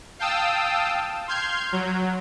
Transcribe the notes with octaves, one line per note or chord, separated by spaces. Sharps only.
F5 G5 A5 D#6 E6
C6 F6 G6 G#6
F#3